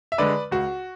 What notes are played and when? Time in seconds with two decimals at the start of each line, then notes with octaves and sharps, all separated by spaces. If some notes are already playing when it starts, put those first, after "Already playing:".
0.12 E5
0.18 D3 G#3 B4 D5
0.51 C#2 F#4